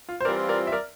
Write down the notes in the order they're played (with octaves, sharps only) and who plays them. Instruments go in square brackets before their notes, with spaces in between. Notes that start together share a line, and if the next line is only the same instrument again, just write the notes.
[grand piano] F4
C5
[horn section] E3 G3 C4 F4 [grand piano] A#4 D5
[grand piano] A#4 D5
E5
A#4 D5